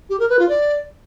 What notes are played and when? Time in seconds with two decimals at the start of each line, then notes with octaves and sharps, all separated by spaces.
0.10 G4
0.19 A#4
0.29 B4
0.39 F4
0.49 D5